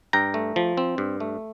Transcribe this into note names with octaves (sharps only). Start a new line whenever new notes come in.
G2 G5 A#5
A3
F3
C4
G2
A3